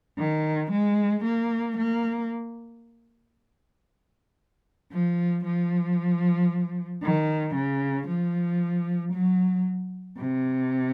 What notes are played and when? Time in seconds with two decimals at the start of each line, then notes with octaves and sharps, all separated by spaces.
0.19 D#3
0.71 G#3
1.24 A#3
1.77 A#3
4.92 F3
5.44 F3
7.03 D#3
7.55 C#3
8.08 F3
9.13 F#3
10.18 C3